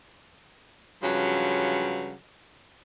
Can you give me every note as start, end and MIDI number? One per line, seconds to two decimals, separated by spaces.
1.03 2.12 43
1.03 2.12 49
1.03 2.12 53
1.03 2.12 54